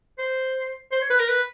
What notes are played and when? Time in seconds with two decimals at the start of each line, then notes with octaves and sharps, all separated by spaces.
0.19 C5
0.92 C5
1.02 C#5
1.10 B4
1.20 A#4
1.29 B4